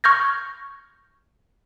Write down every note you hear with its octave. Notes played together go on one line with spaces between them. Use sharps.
C#6 F6 G6 G#6 A#6